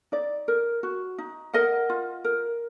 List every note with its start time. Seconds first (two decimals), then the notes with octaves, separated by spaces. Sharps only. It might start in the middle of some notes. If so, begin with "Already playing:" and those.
0.12 D#4 D5
0.48 A#4
0.83 F#4
1.18 D#4
1.54 A#4 D#5 F#5
1.90 F4
2.24 A#4